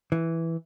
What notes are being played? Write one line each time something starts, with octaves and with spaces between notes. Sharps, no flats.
E3